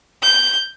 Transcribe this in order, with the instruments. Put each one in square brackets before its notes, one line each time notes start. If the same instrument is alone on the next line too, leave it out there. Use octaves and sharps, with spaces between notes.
[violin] G6